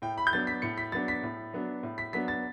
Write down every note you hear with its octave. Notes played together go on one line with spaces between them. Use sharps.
A2 G5
B5
G6
F#3 B3 D4 A6
B6
A2 C#7
B6
F#3 B3 D4 A6
B6
A2
F#3 B3 D4
A2
B6
F#3 B3 D4 B6
A6